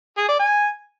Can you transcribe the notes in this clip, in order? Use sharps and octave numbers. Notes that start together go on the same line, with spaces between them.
G#4
D5
G#5